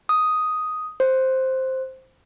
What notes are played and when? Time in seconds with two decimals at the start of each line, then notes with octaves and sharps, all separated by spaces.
0.09 D#6
1.00 C5